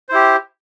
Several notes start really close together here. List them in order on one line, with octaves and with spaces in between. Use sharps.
C5 E4 G4